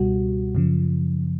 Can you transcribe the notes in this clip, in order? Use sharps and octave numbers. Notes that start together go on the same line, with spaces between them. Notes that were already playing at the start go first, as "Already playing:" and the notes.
Already playing: C#2 B2 G3 F#4
F#2 C#3 F3